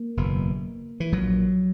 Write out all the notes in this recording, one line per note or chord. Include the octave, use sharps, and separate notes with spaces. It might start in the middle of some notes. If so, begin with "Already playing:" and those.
Already playing: A#3
F#1 E2 B2
E3
A#1 A#2 F#3